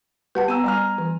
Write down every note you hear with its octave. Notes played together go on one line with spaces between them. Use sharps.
G3 B4 F#5 A5
B3 A#5 E6 D#7
G3 G#5 A#5 F6
E3